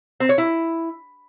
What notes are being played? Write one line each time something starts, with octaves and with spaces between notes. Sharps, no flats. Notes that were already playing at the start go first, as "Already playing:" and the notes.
C4
C#5
E4